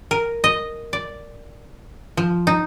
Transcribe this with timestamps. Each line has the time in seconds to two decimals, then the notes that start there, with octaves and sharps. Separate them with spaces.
0.11 A#4
0.44 D#5
0.93 D5
2.17 F3
2.47 D#4